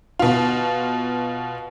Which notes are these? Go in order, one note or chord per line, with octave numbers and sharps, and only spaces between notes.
B2 F4